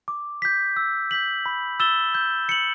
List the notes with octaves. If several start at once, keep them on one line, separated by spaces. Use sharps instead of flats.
D6
G6 B6
E6
G6 B6 F#7
B5
E6 A6 E7 G7
G6
C#7 F#7